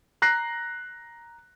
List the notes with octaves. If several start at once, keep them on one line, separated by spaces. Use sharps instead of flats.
A#5 F#6 A#6 C7